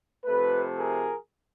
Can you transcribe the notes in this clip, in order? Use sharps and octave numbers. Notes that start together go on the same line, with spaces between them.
C3 F3 A3 A4 B4
G#4 A#4